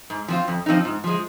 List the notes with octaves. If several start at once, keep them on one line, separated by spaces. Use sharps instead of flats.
G#2
F3 C4 F4
F2
F3 C4 D#4
G#2
F3 G#3